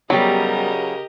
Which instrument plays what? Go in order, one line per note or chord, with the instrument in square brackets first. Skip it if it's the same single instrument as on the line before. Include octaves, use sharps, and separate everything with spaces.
[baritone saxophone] C#3 [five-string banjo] F#3 [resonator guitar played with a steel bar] G3 B3 [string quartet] G4 A#4 D#5